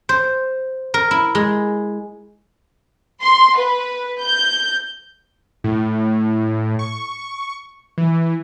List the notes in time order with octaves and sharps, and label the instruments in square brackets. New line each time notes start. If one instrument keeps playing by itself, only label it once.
[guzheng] C5
A#4
E4
G#3
[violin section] C6
B4
G6
[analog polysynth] A2
C#6
E3